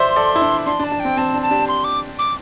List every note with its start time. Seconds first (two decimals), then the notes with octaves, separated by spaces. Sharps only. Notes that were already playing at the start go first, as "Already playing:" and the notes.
Already playing: C5 D5 E5 C6
0.16 A4 D5
0.36 E4
0.42 D4
0.66 D4 C6
0.80 D4
0.84 A5
0.92 D4
1.00 C4 G5
1.17 C4 A5
1.34 D4
1.42 A5
1.51 D4 G4
1.68 C6
1.84 D6
2.19 D6